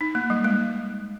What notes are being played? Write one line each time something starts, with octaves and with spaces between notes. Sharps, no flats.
D#4
A#3
G3
G#3